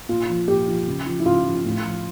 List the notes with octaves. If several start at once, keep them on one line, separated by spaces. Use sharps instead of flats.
A#2 F4
F3
A#2 G4
F3
C#3
F3
E4
C#3 F4
F3
A2
F3